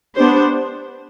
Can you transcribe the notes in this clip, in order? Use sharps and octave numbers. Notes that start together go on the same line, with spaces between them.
B3 D4 G4 C5